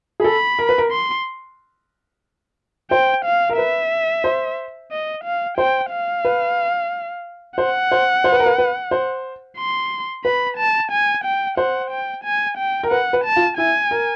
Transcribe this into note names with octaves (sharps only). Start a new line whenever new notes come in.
G#4
A4 B5
A#4
B4
A#4
C6
C5 G5
F5
A#4
B4 E5
C5
D#5
F5
C5 G5
F5
B4
C5 F#5
C5
C5
B4
A#4
B4
B4
C5
C6
B4 B5
A5
G#5
G5
C5 F#5
G5
G#5
G5
A#4
B4 F#5
B4
A5
F4
E4 G#5
A#4